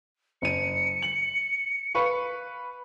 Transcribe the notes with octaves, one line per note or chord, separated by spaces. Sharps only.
F#1 C#7 D#7
F#7
B4 F5 C#6